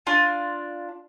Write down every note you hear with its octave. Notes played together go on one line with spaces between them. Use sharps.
D4 F4